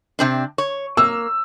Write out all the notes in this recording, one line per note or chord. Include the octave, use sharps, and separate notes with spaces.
C3 C4 D4
C#5
A#3 E6